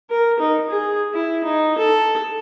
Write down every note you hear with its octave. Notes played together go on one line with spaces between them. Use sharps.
A#4
D#4
G#4
E4
D#4
A4